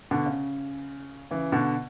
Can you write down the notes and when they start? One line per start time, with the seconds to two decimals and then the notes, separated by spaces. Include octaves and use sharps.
0.11 B2 D3
0.26 C#3
1.31 C#3 E3
1.52 B2 D3